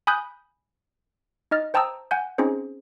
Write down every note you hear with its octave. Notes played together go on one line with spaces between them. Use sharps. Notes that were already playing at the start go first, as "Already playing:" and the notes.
G#5 B5 D#6 F#6 G6
D#4 D#5 F6 A6
C5 G5 A5 A#5 D#6 E6
F#5 G#5 G6
C4 C#4 D#4 G#4 C5